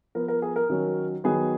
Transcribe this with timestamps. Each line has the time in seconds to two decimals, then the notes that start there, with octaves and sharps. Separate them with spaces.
0.15 F3 B3 A#4
0.28 A#4
0.42 G#4
0.56 A#4
0.70 D#3 F#3 C#4
1.24 D#3 F#3 B3 G#4